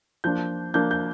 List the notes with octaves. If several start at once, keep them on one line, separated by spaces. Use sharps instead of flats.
F3 A#3 D4 G6
F3 A#3 D4 G6
G6